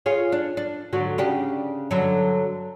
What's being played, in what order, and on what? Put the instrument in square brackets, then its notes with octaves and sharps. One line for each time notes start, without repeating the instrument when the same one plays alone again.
[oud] F4 G#4 C#5
D4
D4
G#2 D3 F#3
C#3 D4 G4
G2 D3 F#3